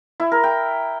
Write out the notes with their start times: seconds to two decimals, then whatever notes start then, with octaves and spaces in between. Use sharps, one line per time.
0.20 E4
0.32 A#4
0.44 G5